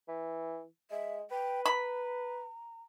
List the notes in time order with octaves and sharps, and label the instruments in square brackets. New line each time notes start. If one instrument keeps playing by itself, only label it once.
[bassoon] E3
[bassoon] G#3 [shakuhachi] E5
[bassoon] B4 [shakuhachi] G5
[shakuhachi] A#5 [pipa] B5